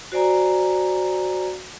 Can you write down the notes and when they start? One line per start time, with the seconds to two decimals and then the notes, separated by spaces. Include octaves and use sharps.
0.12 F#4 C5 D5 G#5 A#5